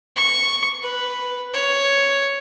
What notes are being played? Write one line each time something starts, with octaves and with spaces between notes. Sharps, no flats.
C#6
B4
C#5